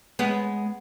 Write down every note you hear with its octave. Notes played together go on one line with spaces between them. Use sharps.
G#3 B3